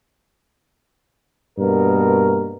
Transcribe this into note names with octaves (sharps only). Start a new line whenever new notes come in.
G2 B2 A#3 A#4